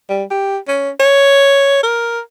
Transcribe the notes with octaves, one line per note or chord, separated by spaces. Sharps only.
G3
G4
C#4
C#5
A#4